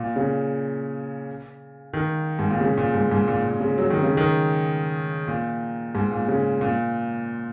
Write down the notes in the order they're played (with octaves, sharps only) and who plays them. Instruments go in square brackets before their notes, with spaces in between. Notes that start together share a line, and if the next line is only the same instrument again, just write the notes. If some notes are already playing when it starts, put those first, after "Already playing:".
Already playing: [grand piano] A#2
C#3
D#3
G#2
A#2
C#3
A#2
G#2
G#2
A#2
A#2
C#3
F#3
D#3
C#3
D#3
A#2
G#2
A#2
C#3
A#2